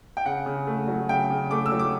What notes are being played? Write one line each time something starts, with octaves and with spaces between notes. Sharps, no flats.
G5
C#3 F#5
C#3
A3
F#3
C#3 G5
C#3
A3 D6
E6
F#3
D6